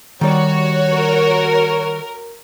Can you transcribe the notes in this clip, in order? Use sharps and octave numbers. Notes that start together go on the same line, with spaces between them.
D#3 G3 F#4 C#5 D5
A#4